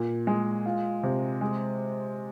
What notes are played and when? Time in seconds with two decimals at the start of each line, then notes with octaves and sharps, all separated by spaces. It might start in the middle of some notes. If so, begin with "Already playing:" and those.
Already playing: A#2
0.27 G#3
0.66 F4
1.03 C3
1.41 G#3